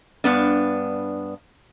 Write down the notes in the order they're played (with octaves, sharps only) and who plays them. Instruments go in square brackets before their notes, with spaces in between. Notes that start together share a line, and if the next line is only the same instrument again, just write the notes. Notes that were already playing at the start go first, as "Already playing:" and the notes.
[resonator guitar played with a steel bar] G2 B3 D4